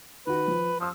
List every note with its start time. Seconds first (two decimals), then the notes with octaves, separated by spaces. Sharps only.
0.27 D#3 F#4 B4
0.48 F3
0.80 F3 D#6 E6